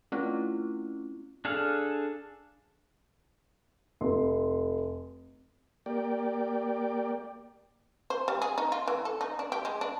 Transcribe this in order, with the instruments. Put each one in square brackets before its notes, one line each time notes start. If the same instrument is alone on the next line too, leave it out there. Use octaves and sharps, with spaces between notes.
[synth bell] A3 C4 C#4 E4 F4
[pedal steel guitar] D4 G#4 A4 F5
[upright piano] F1 C6
[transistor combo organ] A#3 G4 D5
[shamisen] C5
G3
G#4
D#4
F4
E3
A4
D#4
D4
G4
G#3
D4